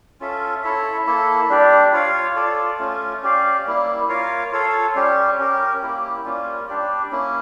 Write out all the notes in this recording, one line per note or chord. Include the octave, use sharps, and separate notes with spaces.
C#4 F4 A4 E5
E4 A4 C#5 E5
A#3 E4 A4 E5
G3 D4 G4 D5
F4 C#5 F5
F4 A4 D5
A3 C#4 F4
C#4 G4 D5 F5
G3 A#3 E4
F4 A#4 C#5 F5
F4 A4 C#5 F5
G3 C#4 G4
C#4 G4 A#4
A#3 E4 G4
G3 A#3 C#4 F4
G3 D4 G4 D5
A#3 C#4 E4